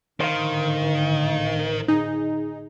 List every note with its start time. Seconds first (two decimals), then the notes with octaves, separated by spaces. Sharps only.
0.20 G#1 A2 D3 D#3 C5 F5
1.88 D#4 G#4